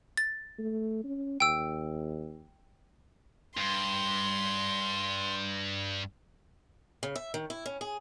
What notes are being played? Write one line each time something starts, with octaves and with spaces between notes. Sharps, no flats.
A6
A3
C#4
D#2 G5 E6
G2 C6
C#3
E5
D#3
E4
C#4
G#4